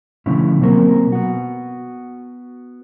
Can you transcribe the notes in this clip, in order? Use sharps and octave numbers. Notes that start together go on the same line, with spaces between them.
B2 D3 F3 A3 C#4 E4
B2 F#3 A#3 C4 A#4
B3 F#4